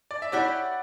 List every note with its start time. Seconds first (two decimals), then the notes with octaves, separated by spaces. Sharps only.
0.11 D5
0.22 E5
0.32 E4 G4 C#5 D5 F#5